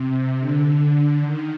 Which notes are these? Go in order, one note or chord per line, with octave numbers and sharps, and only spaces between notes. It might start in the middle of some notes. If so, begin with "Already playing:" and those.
Already playing: C3
D3
D#3